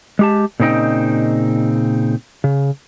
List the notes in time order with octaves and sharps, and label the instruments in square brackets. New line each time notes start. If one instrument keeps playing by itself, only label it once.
[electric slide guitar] G#3 G4 A5
A#2 C#3 C4 D#4 D#5 G5
C#3